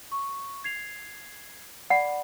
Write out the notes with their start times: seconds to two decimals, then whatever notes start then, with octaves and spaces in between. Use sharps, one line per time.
0.12 C#6
0.64 G#6 C7 F7
1.90 D5 F#5 B5